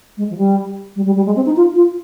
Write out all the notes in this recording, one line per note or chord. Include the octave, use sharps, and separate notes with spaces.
G#3
F3
G3
G3
G3
G3
G#3
C4
D#4
F4
F4